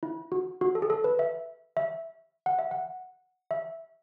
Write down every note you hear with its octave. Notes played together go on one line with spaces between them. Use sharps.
E4
F#4
F#4
A4
G#4
A4
B4
E5
E5
F#5
E5
F#5
E5